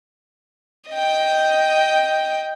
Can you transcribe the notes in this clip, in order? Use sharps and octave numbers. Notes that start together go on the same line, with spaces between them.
D#5 G5